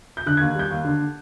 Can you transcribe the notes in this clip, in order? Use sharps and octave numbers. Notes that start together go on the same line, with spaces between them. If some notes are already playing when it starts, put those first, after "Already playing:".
G6
D3 F#6
G#6
D#2
G3 G6
D#2
D3